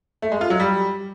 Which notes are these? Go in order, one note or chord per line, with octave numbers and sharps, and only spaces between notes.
A3
G#3
F4
F#3
G3